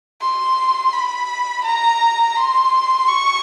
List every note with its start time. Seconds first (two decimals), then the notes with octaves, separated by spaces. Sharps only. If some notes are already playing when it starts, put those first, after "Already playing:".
0.21 C6
0.93 B5
1.64 A#5
2.36 C6
3.08 C#6